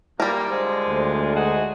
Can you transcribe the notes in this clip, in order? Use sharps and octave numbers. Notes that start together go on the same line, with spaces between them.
A#2 G3 A#3 A#4
D3 G#3 F4 C5
D2
G#3 D#4 F#4 G#4